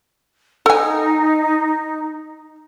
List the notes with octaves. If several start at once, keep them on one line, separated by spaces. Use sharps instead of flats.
D#4 A4 G#5